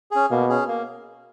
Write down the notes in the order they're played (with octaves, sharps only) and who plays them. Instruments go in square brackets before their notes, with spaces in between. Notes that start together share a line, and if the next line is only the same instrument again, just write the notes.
[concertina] C#4 G#4
[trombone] B2 [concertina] A#3
[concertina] C#4 G#4
A#3